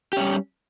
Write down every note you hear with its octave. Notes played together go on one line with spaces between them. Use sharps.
G3 C#4 G4